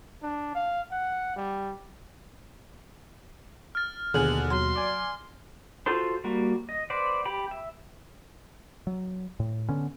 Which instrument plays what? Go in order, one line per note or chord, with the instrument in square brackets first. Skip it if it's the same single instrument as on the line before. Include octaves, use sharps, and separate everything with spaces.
[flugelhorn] D4
F5
F#5
G3
[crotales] F6 A6
[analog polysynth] D#2 B2 [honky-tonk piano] D3 G#4 [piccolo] F#7
[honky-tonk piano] F#3 [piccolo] C6
[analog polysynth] D5 G#5
[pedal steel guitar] F4 F#4 A4 C5 C6
G3 A#3 F#4
D#5
B4 C5 D5 F#5
G4 G5 B5
E5
[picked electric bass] F#3
A2
D3 B3 C#4